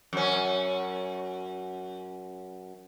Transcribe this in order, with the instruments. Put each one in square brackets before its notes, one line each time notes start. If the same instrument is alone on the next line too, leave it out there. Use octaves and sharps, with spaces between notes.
[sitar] F#2 C#4